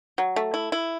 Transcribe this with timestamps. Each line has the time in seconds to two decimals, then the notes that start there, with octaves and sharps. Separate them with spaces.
0.18 F#3
0.36 A3
0.54 E4
0.72 E4